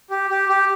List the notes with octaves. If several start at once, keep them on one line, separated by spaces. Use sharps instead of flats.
G4
G4
G4